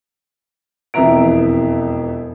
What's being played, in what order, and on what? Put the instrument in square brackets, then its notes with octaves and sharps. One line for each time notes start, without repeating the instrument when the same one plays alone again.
[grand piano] E1 F2 E3 E5 A#5 D7